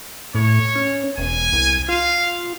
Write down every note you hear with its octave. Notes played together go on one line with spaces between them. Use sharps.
A2 C#5
C#4
E1 G#5
C2
F4 F5